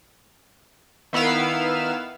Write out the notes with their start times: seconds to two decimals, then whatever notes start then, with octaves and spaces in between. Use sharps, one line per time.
1.13 D#3 B3 E4 F5 E6